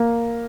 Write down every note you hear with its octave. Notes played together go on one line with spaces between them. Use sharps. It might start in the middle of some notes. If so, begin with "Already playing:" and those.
Already playing: A#3